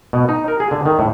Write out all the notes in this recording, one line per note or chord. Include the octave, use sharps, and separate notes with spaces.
B2
D#4
A#4
G#4
D3
D#3
A2